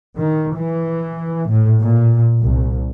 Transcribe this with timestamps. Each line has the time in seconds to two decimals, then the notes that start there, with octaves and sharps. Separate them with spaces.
0.17 D#3
0.56 E3
1.49 A2
1.81 A#2
2.41 C2